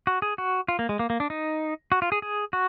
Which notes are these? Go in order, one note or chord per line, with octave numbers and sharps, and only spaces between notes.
F#4
G#4
F#4
F4
A#3
G#3
A#3
A#3
D4
D#4
F#4
F4
G#4
G#4
F#4